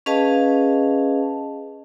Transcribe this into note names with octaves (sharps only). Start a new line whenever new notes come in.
C#4 G#4 B4 D#5 F5 A5